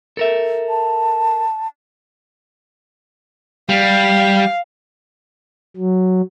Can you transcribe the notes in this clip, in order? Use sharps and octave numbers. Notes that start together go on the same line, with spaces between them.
A4 A#4 E5
A5
G3 F5
F#3